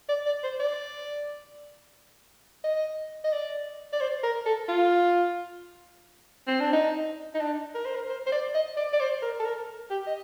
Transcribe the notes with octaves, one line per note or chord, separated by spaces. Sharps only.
D5
D5
C5
D5
D#5
D#5
D5
D5
C5
A#4
A4
F4
C4
D4
D#4
D#4
D4
A#4
C5
A#4
C5
C5
D5
D#5
D5
D5
C5
A#4
A4
A#4
G4
D#5